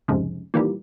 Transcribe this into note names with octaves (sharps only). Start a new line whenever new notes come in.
C2 F2 G#2 C#3
A#2 D#3 E3 G3